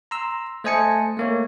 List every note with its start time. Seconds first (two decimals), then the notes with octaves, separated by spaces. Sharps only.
0.11 A#5 C6 E6
0.64 A3 C5 D#5 G#5 A5 C#7
1.17 A3 A#3 C#5